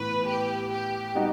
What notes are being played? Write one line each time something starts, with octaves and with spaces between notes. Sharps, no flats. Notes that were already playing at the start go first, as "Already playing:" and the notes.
Already playing: A2 E3 B3 B4
G4
G4
G3 B3 D#4 F#4